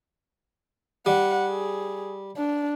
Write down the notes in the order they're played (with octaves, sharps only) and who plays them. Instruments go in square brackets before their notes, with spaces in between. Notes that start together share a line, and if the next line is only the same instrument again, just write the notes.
[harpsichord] G3 [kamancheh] F#5
[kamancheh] G#4
D4